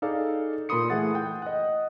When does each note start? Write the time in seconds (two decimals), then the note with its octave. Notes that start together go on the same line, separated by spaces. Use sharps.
0.02 D#4 G#4 A4 D5 F5
0.69 A#2 A#4 B5 C6 D#6 C#7
0.90 E3 A3 G#4 F#5 A6
1.14 F#5 G5
1.42 D#5 F#5